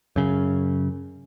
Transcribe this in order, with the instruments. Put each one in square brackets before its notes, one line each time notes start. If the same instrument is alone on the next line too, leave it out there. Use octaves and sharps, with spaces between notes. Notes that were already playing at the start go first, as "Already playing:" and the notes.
[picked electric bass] F#2 C#3